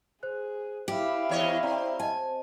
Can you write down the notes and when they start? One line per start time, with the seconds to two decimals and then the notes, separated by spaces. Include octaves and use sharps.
0.23 G#4 C5 F#6
0.88 E4 G4 F5
1.29 E2 C#5 D#5
1.63 C4 D5 A#5
2.00 D#5 G#5 A5